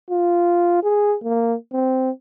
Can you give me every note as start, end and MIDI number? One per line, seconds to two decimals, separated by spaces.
0.11 0.80 65
0.84 1.16 68
1.24 1.55 58
1.73 2.11 60